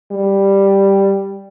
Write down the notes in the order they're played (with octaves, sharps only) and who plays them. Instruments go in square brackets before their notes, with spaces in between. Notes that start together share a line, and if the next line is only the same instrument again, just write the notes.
[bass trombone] G3